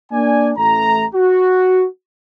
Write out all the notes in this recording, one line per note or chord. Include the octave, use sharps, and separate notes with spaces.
A#3 D4 D5 G#5
A1 A3 A#5
F#4